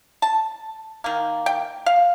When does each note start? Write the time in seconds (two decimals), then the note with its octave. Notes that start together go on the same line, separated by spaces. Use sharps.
0.22 A5
1.04 D#3 A#3
1.46 G5
1.86 F5